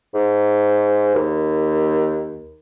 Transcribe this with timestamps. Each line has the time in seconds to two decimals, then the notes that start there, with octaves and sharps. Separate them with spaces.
0.14 G#2
1.15 D#2